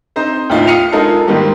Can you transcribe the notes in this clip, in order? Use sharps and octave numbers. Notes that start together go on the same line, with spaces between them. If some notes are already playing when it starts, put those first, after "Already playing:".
C4 D#4 C5
D#2 A2 D#4 F4 E5
D#6 F6 C7 C#7 D#7 F7
G#3 D#4 F4 A4 A#4
G#2 D#3 G3 A#3